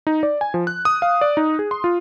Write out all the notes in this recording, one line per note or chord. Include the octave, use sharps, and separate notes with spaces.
D#4
D5
G#5
F3
F#6
D#6
F5
D5
D#4
G#4
C6
F4